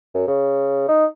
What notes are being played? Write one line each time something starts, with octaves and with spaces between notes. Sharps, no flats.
F#2
C#3
D#4